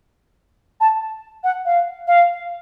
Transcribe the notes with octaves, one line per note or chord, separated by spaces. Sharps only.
A5
F#5
F5
F5